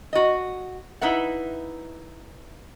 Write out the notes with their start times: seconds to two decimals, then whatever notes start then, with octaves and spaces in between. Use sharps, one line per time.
0.13 F#4 D#5
1.01 D#4 E4 B4 E5 F#5